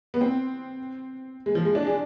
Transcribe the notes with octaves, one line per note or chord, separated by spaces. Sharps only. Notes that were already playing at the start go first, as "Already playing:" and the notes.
B3
C4
G#3
F3
G#3
D4
G#4